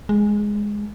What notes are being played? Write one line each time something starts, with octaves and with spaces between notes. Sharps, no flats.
G#3